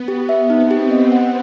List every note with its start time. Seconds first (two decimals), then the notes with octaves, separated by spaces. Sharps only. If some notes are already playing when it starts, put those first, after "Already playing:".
Already playing: B3
0.08 G4
0.29 E5
0.50 C4 D#4
0.71 G4
0.91 D#5
1.12 F#5